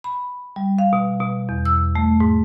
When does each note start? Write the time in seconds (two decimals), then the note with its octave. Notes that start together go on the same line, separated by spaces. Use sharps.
0.04 B5
0.56 G3
0.79 F5
0.93 B2
1.20 B2
1.49 E2
1.65 E6
1.95 A3
2.20 G#2